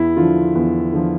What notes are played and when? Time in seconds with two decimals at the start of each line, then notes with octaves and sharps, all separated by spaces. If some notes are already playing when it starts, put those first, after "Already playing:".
Already playing: E2 E4
0.17 D3 F3 F4
0.55 E2
0.93 D3 F3